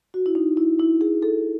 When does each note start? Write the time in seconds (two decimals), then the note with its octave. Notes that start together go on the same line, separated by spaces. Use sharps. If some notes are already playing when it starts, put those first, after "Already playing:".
0.14 F#4
0.26 E4
0.35 D#4
0.57 E4
0.80 E4
1.01 G#4
1.23 A4